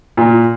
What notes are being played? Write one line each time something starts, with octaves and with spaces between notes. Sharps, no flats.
A#2